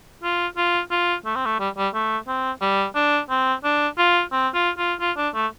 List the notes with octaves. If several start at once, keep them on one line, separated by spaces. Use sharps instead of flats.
F4
F4
F4
A3
C4
A3
G3
G3
A3
C4
G3
D4
C4
D4
F4
C4
F4
F4
F4
D4
A3